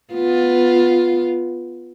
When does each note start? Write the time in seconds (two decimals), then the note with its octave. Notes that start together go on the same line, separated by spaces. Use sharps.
0.13 B3 F4